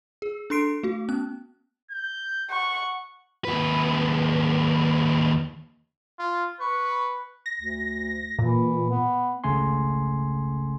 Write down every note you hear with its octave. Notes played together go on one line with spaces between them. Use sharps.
G#4
D4 A4 C6 C7 D7
A3 F#4
B3 C#4 F#6
G6
F#5 C#6
D#2 B4
F4
B4 C#6
A#6
D2
A#2 E3
B3
G#1 C#2 C#3 A3 G#5 C6